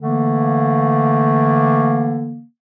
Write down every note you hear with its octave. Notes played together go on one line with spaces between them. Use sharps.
D3 E3 A3 A#3